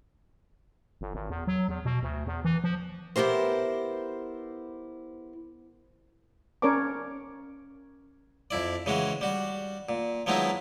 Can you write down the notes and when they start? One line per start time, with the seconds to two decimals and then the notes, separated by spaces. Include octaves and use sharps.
1.01 G1
1.14 G#1
1.30 E2
1.47 F#3
1.68 E2
1.85 B2
2.03 D2
2.27 E2
2.45 E3
2.64 F3
3.16 B3 E4 G4 A#4 C5
6.62 C#4 A#4 C#5 D5 A5 D6
8.51 F2 E4 D5
8.86 C#3 E3 G#3 C#4 F#4
9.21 G3 F#4
9.89 A#2
10.27 F3 F#3 G#3 B3 D#4 E4